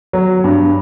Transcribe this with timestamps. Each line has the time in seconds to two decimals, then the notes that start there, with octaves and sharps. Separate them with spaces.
0.13 F#3
0.44 G2